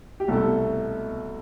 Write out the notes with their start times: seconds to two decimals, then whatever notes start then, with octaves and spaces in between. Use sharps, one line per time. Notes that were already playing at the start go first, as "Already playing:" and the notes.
0.20 G4
0.28 C2 B2 A3 A4